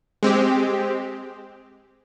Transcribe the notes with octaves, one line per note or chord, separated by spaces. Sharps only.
G#3 C4 G4